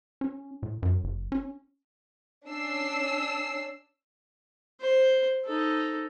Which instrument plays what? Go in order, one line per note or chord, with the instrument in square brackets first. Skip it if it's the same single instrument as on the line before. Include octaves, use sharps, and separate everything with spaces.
[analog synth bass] C#4
A2
F#2
F#1
C#4
[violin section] C#4 D4 E6 C7
[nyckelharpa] C5
D#4 A4